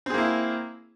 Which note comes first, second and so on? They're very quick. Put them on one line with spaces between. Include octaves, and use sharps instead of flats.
C4 G#4 A#3 E4